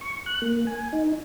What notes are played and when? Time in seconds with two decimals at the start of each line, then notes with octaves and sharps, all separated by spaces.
0.01 C#6
0.26 F#6
0.42 A#3
0.67 G#5
0.93 D#4